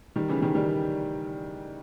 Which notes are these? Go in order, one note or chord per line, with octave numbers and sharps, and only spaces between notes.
D#3 G3
C#3 E3
D#3 G3
D#3 G3